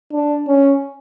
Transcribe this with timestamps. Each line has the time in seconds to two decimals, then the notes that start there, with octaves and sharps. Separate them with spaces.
0.12 D4
0.47 C#4